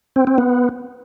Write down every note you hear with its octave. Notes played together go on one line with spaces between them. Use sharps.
C4
C4
B3